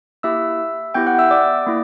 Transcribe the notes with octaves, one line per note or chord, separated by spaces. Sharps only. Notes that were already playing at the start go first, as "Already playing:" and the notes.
A#3 E4 G4 E5 E6
B3 E4 G4 G5 G6
F#5 F#6
E5 E6
D5 D6
A#3 E4